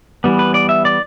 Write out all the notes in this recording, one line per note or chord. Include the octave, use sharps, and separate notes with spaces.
E3 G3 B3
B4
D5
E5
D5